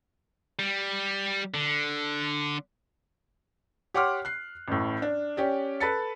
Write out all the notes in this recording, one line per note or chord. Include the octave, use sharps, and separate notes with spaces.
G3
D3
G4 C#5 F#5 C6 D6 F6
F#6 C7
A1 A2
D4
C#4 G4 D5
A4 B4 A5 A6 C#7